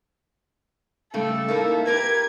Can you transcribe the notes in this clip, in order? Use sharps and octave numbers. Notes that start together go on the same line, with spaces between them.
C#3 G3 A3 A4
A#3 D#4 E4
G4 A#4 B4 G#6